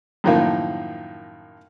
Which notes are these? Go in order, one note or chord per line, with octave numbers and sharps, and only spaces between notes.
F#2 A2 D#3 F3 A#3